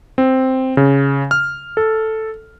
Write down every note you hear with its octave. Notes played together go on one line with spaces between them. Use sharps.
C4
C#3
F6
A4